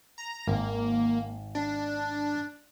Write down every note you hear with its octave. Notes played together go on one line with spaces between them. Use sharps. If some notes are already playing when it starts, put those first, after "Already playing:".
A#5
G#1 A#3
D4